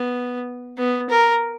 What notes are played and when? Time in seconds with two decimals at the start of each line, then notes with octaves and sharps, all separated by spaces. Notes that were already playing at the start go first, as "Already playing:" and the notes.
Already playing: B3
0.78 B3
1.10 A#4